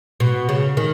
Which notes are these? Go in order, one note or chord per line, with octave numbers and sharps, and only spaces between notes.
B2
C#3
D#3